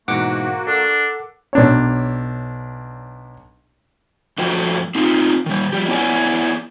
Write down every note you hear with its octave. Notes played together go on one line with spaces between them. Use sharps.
G#2 B2 E3 A#3 F#4 F#5 D6
D4 A4 A#4
B1 D4 C#5
F#2 F3 A3 F#4 C5 G5
C4 D#4 F4
D#3 G3
F3 G3 G4
B3 E4 C#5 D5 G#5